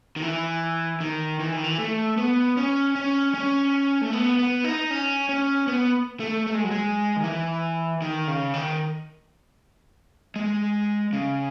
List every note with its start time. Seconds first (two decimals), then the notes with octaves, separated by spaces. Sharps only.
0.16 D#3
0.22 E3
1.00 D#3
1.40 E3
1.52 D#3
1.64 E3
1.78 A3
2.17 B3
2.57 C#4
2.95 C#4
3.34 C#4
4.01 A3
4.13 B3
4.39 B3
4.64 D#4
4.91 C#4
5.29 C#4
5.67 B3
6.20 A3
6.47 A3
6.54 G#3
6.64 F#3
6.71 G#3
7.16 D#3
7.24 E3
8.02 D#3
8.28 C#3
8.54 D#3
10.36 G#3
11.13 C#3